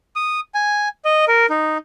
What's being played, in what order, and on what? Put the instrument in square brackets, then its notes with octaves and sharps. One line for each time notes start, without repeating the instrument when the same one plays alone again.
[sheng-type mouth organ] D#6
G#5
D#5
A#4
D#4